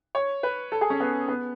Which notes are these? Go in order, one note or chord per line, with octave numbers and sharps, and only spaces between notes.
C#5
B4
A4
G#4
C#4
B3
B3